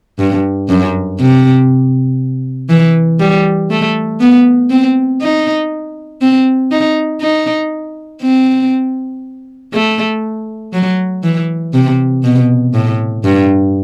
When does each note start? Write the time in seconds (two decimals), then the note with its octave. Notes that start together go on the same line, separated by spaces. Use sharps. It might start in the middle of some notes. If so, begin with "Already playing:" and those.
0.19 G2
0.69 F#2
1.20 C3
2.69 E3
3.20 G3
3.71 A3
4.20 B3
4.70 C4
5.21 D#4
6.22 C4
6.71 D#4
7.21 D#4
8.22 C4
9.73 A3
10.73 F#3
11.23 E3
11.74 C3
12.24 B2
12.74 A2
13.24 G2